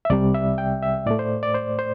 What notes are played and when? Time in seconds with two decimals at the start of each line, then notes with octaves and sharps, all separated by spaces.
0.05 E5
0.10 C2 C3 G3 D5
0.34 E5
0.58 G5
0.83 E5
1.06 A2 A3 D5
1.19 C5
1.43 D5
1.54 C5
1.79 C5